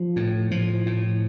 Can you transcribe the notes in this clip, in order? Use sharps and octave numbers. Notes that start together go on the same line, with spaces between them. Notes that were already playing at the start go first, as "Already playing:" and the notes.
Already playing: F3
A2
A2 F3
A2